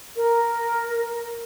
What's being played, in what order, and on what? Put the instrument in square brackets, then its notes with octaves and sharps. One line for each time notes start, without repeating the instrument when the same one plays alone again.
[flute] A#4